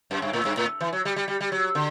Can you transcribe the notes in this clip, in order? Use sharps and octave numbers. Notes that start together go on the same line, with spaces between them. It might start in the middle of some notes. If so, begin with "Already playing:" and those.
F#2
G2
A2
G2
A2
E3
F#3
G3
G3
G3
G3
F#3
D3